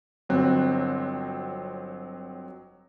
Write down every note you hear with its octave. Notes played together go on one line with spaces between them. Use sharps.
G1 F#3 C4 F#6